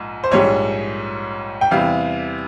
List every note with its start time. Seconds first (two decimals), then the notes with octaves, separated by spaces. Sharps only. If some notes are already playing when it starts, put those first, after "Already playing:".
Already playing: A#1 G#2
0.24 C5
0.31 A#1 G#2 G3 C#5
1.61 G5
1.71 E2 C3 G3 F5